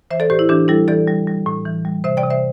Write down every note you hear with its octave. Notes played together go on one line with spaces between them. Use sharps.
E3 C5 E5
A4 D5
A2 G4 C5
E4
E3 D4 G4
G3 E4 A4
E3 A4 D5
G3
G3
A2
E3
G3
C3 C5 E5
D5 G5
C3
C5 E5